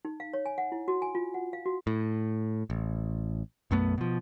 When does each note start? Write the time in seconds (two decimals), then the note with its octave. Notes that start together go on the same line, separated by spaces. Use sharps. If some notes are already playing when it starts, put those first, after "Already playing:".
0.05 D#4
0.20 F5
0.34 C#5
0.46 G#5
0.58 F#5
0.72 E4
0.88 F#4
1.02 G#5
1.15 F4
1.34 F#5
1.53 F5
1.66 F#4
1.87 A2
2.70 A1
3.71 B1 F#2 A3 B3
3.98 B2 F3